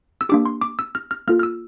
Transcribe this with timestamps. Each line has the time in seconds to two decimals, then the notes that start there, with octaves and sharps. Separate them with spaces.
0.21 E6
0.29 A#3 D4 G4 D6
0.46 C6
0.61 D6
0.79 E6
0.95 F6
1.11 F6
1.28 A#3 F4 A4 F6
1.39 F6
1.43 E6